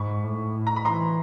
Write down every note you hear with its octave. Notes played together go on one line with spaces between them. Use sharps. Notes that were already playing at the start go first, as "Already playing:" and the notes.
Already playing: G#2 B5 C#6
A2
A#5
B5
E3 A#5 C6